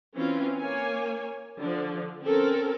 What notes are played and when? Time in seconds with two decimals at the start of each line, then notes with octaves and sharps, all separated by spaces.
0.15 E3 C4 C#4 F4
0.58 A#3 C#5 G#5
1.58 D3 F3
2.22 C4 C#4 A4 A#4